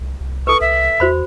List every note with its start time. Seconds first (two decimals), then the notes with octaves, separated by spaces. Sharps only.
0.01 C2
0.20 C2
0.47 A4 B4 C#6
0.61 C2 E5
1.00 E2 F#4 C5 B5